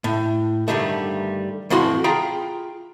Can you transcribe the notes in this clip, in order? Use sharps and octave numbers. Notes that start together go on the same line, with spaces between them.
A2
G2 B2 D3 D#3 G3 A3
F2 A2 E3 F#4 C6
F4 G#4 G5 A#5 B5